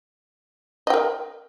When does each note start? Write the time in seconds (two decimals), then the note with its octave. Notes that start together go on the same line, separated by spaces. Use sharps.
0.87 D#5
0.90 G5
0.94 A#4